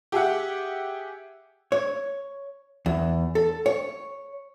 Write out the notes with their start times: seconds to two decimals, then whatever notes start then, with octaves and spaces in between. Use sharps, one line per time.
0.12 G4 G#4 E5 F#5
1.72 C#5
2.86 E2
3.35 A4
3.66 C#5